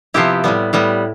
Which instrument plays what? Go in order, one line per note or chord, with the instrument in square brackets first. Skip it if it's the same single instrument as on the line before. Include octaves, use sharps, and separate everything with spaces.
[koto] C3 F3 B3 E4 G4
A2 G3 B3
A2 G3 B3